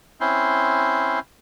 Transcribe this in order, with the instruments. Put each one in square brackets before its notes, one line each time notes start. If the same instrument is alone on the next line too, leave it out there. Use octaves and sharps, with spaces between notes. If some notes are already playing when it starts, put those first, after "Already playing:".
[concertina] C4 C#4 E4 C6